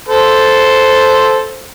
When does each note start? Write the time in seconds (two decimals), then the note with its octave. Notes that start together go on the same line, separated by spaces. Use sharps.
0.08 A4 C5